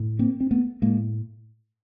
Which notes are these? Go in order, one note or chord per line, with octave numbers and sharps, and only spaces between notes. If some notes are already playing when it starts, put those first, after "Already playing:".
Already playing: A2
A#3 C4
C4
A3 B3
A2 G#3 A#3